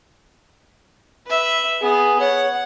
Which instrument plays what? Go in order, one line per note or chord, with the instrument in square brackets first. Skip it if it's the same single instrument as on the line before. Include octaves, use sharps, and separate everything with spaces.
[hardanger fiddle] B4 E5
[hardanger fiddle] B3 [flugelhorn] G#4
[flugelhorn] C#5 [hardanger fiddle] F#5